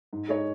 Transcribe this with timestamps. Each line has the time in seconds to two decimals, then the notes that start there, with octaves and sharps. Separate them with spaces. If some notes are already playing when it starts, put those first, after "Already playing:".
0.13 G#2
0.28 G#3 D#4 C#5